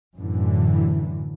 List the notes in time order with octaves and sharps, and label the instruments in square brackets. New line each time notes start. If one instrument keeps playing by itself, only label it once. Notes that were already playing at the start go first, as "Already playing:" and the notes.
[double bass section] F#2 A2 D3 E3